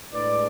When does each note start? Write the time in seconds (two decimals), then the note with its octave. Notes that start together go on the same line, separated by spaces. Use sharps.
0.12 A2 G#3 D4 B4 D5